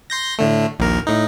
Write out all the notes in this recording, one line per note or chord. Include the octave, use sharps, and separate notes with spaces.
C6 G6 A#6
A2 D3 A3
A#1 D#2 A#4
A2 D#4